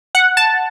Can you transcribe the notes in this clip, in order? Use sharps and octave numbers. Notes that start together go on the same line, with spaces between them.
F#5
A5